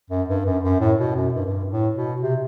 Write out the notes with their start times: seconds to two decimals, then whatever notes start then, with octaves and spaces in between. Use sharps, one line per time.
0.10 F#2
0.29 G2
0.46 F#2
0.63 F#2
0.80 A2
0.99 B2
1.16 F#2
1.34 G2
1.46 F#2
1.51 G2
1.70 A2
1.95 B2
2.22 C3